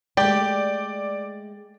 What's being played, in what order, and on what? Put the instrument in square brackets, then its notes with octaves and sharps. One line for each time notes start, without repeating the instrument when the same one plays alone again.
[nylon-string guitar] G#3 A3 [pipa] G4 [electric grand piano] D5